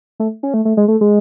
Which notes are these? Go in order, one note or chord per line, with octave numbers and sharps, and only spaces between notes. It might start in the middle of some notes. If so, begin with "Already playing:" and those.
A3
C#4
A3
A3
G#3
A3
G#3